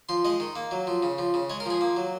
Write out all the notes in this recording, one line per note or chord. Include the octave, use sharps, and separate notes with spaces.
F3 C6
G#3 D#5
D#3
A#3
F#3
F3
C#3
F3
C#3
G#3 C#5
A#4
F3 G#4
A#3
F#3